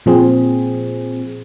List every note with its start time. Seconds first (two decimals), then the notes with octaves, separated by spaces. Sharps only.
0.06 A#2 F3 C4 G#4